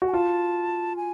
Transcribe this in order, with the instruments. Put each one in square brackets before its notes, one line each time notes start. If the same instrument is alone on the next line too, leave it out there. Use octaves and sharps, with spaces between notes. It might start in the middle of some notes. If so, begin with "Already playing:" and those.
[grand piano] F#4
[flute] G#5
[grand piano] F4 [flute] A5
[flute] G#5